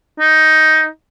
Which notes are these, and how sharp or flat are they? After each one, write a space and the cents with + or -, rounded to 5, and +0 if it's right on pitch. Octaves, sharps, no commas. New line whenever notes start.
D#4 +10